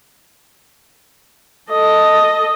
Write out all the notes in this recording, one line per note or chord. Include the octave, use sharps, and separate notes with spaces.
A4 D#5